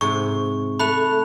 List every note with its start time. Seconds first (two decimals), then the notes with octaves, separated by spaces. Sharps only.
0.01 G#2 C3 C#6
0.80 A3 B5 F#6 F7